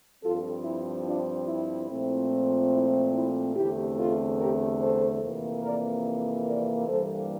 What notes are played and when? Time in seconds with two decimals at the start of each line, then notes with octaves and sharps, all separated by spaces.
0.23 G2 F3 C4 F4 A4
0.65 E4
1.06 D4 F4
1.48 E4
1.89 A#2 F3 A3 C4
2.72 E4
3.14 E4
3.55 E2 D3 A3 C4 E4 G4
3.97 F4 A4
4.39 G4 A#4
4.80 A4 C5
5.22 F2 C3 E3 A#3
5.63 A#4 D5
6.46 A#4 D5
6.87 G2 E3 G3 A#3 A4 C5